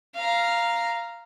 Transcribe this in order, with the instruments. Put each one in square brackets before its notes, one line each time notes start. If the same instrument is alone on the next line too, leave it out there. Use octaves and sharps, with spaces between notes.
[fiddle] F5 A#5